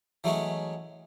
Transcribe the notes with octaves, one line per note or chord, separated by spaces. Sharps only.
E3 F#3 G#3 A3 C#4 C#5